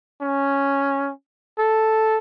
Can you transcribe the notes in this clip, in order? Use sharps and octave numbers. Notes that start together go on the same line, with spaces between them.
C#4
A4